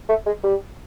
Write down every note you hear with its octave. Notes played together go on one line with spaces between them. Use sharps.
A3
G#3
G3